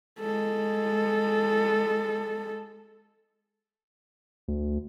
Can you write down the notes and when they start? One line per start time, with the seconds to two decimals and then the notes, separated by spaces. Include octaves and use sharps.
0.20 G#3 A4
4.48 D2